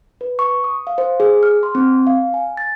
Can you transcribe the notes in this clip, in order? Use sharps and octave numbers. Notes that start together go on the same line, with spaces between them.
B4
C#6
D#6
F5
C5
G#4
F6
C6
C4
F5
G#5
A6